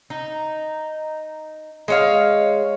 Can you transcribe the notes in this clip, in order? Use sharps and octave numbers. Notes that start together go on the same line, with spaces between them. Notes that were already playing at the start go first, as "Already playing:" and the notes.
D#4
G#3 C#5 F5